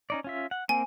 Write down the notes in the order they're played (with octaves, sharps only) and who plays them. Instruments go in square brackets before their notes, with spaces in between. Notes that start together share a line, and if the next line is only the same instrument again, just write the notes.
[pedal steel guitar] C#4 D#4 D5
C#4 F4 E5
F#5
[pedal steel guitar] A#3 C4 [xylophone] G#5